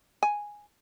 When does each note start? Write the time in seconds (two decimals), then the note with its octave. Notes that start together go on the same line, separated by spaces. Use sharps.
0.23 G#5